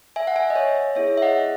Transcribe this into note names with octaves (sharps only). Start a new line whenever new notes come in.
E5 G#5
F#5
E5 G#5
D#5
C#5 E5
B3 E4 G#4 C#5 E5
E5
D#5 F#5